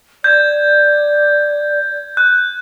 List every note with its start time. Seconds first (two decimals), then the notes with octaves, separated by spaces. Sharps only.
0.24 D5 G6 G#6
2.17 F#6